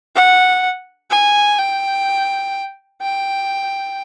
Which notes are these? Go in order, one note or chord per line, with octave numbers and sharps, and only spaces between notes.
F#5
G#5
G5
G5